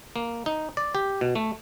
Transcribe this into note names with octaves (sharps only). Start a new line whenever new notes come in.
A#3
D#4
D5
G4
B2
A3